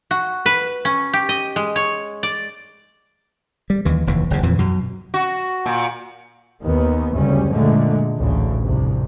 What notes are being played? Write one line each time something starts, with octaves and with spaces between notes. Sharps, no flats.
F#4
B4
C#4
G4
D#5
G#3
C#5
D5
G3
D#2 E3
F1 D#2 E3
F#1 F2 C#3
F2 A#2 E3
F#2 B2
F#4
A#2
D#2 D#3 B3
F#1 D2 C#3 G3 C#4
A#2 D3 G#3 A3
A1 D2 A2 C#3
C2 F2 C3